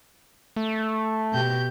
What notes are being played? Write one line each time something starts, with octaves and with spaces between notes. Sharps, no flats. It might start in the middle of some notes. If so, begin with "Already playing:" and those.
A3
B2 G4 G6